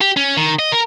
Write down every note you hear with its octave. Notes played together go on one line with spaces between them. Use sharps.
G4
C#4
D#3
D#5
A#4